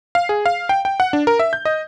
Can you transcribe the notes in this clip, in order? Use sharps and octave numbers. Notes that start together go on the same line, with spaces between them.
F5
G#4
F5
G5
G5
F#5
D4
A#4
E5
G6
D#5